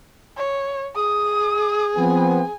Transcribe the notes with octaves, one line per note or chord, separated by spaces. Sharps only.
C#5
G#4 D#6
F3 B3 C4 G#5